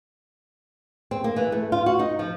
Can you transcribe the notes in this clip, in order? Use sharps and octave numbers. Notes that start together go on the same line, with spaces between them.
C4
A#3
E3
A3
F4
F#4
D#4
F3